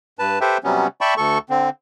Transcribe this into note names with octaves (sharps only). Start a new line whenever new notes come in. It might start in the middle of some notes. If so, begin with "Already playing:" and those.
G2 B4 A5
G4 A4 B4 C5 E5 G5
C3 F#3 G3 B3 C#4
D5 E5 G5 A5 B5 C#6
D2 A4 C#6
D3 C4